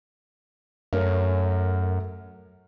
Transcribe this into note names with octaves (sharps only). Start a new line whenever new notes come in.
F#2 A3 A#4 C#5